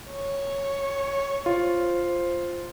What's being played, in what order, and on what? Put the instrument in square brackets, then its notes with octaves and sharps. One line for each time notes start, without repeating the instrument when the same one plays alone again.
[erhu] C#5
[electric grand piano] F4 [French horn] C5